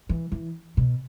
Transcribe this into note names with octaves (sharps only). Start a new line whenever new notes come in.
E3
E3
B2